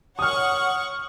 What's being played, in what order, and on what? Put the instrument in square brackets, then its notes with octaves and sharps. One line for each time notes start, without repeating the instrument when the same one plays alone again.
[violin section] C#5 F#5 C#6 [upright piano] D#6 F6